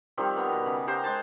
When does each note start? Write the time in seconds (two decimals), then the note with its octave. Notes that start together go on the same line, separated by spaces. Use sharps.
0.17 D#3 F3 G3 C4
0.37 B3 A#4
0.52 B2
0.66 C#3
0.87 G4 A#4 C5 G5
1.04 G#3 C5 A5